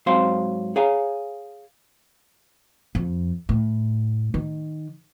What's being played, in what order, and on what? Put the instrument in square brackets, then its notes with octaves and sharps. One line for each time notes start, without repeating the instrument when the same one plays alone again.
[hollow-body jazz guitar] G#2 F#3 C4 C5 F5 C6
G#4 C#5 F5 G#5 A#5
[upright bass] F2
A2
D#3